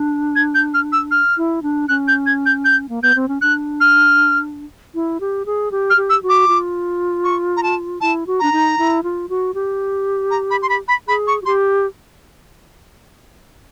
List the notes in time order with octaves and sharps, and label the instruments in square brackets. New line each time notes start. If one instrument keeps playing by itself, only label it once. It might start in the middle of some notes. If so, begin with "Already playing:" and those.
Already playing: [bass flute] D4
[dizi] G#6
G6
F6
E6
F6
[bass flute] E4
D4
[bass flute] C#4 [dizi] F#6
[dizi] G6
G#6
G6
G6
[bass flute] A#3
[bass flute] B3 [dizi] G6
[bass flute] C4
C#4
[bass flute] D4 [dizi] F#6
[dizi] F6
[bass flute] E4
G4
G#4
G4
[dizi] F6
[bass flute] G4
[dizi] E6
[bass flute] F#4
[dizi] D6
[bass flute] F4
[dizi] C#6
A#5
A5
[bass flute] E4 [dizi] A5
[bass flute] F#4
[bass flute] D4 [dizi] A#5
[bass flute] D#4
E4
F4
F#4
G4
[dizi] A#5
B5
C6
B5
B5
[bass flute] G#4 [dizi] B5
[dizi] C#6
[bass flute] F#4
[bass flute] G4 [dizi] C6